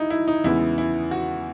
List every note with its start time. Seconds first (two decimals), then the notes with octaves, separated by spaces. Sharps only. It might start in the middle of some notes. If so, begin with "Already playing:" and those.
Already playing: D#4 E4
0.10 E4
0.28 D#4
0.44 E2 C#3 G#3 B3 E4
0.78 E4
1.11 F#4